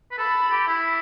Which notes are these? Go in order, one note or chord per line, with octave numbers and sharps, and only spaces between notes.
B4
A4 B5
G4
E4